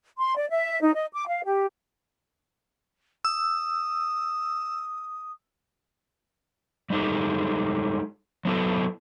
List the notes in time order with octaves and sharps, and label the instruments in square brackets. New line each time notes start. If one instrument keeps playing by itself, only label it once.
[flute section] C6
D5
E5
D#4
D#5
D6
F5
G4
[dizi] D#6 [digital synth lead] E6
[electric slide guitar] G3 G#3 D#4 G4 A4
F#3 B3 E4 A4